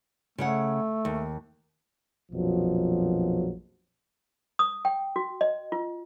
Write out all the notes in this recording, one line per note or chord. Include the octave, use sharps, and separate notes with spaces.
C#3 A3 C#5 F#5
D#2
A#1 F2 B2 F3 F#3
D#6
G5
F#4
D#5
F4